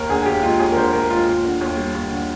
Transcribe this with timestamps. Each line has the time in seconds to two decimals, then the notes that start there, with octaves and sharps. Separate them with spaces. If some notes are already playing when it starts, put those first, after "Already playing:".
Already playing: D#2 A#4
0.09 D3 G#4
0.22 G#4
0.26 D#2 G4
0.43 G#3 F4
0.59 D#2 G#4
0.72 A#4
0.76 D3 C5
0.93 D#2 A#4
1.10 G#3 F4
1.27 D#2
1.44 D3
1.61 D#2
1.77 G3
1.95 D#2
2.11 D3